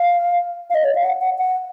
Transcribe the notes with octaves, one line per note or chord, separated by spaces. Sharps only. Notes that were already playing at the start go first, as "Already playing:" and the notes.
Already playing: F5
F5
D#5
C#5
F5
F#5
F#5
F#5